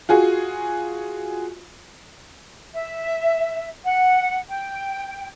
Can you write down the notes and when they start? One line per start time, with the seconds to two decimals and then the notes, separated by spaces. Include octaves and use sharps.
0.09 F4 F#4 G#4
2.73 E5
3.85 F#5
4.49 G5